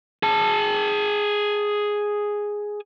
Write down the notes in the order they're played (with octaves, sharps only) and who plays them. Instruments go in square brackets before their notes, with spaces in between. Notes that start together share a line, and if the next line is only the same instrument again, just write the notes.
[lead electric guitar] G#4 A5